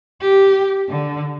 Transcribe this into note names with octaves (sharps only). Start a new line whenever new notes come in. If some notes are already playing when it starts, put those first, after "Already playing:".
G4
D3